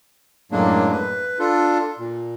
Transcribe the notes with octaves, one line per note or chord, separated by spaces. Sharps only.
F#2 A2 F#3 G#3 A#3 D4
B4
D4 F4 A4
A#2